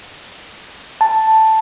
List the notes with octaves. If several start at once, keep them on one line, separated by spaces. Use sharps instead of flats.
A5